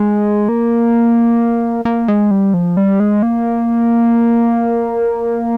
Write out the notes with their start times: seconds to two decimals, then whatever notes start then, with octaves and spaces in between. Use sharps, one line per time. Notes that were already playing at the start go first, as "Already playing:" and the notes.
Already playing: G#3
0.49 A#3
1.85 A#3
2.08 G#3
2.31 G3
2.54 F3
2.77 G3
3.00 G#3
3.23 A#3